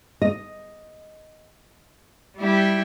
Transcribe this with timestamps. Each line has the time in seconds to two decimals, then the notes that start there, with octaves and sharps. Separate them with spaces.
0.22 D#5
2.37 G3 E4 G4